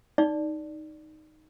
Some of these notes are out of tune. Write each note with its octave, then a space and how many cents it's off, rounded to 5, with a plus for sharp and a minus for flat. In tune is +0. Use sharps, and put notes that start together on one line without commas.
D#4 +0 D5 +0